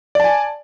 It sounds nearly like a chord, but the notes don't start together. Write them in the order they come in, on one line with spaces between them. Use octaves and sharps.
D5 A5 G#5